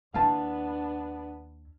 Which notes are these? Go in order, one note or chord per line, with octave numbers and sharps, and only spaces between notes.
D#2 B3 D4 E4 F5 A5